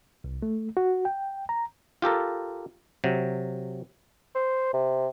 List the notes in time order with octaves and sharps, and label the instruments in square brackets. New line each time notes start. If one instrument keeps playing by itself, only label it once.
[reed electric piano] C2
A3
F#4
G5
A#5
[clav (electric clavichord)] F4 G4 A4 A#4
C3 F#3
[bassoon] C5
C3